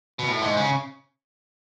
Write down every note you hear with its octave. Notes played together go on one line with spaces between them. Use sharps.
B2
A2
G#2
C#3